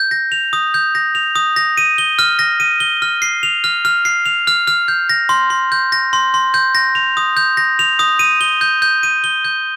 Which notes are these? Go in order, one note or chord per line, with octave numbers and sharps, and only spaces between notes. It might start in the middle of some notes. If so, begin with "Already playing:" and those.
Already playing: G6
A#6
F7
D#6
G6
A#6
F7
D#6
A#6
D#7
G7
F6
A#6
D#7
G7
F6
C7
F7
F6
F6
C7
F7
F6
F6
G6
A#6
C6
C6
G6
A#6
C6
C6
G6
A#6
F7
D#6
G6
A#6
F7
D#6
D#7
G7
G6
G6
D#7
G7
G6